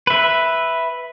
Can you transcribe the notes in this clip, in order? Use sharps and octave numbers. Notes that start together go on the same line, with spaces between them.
B4 E5